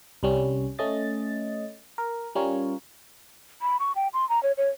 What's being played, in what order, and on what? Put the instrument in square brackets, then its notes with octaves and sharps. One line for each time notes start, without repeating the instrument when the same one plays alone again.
[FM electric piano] C2 G3 C#4
A3 C#4 D#5 A6
A#4
G3 C#4 F4 A#4 C#5
[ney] B5
C#6
G5
C6
A#5
C#5
C#5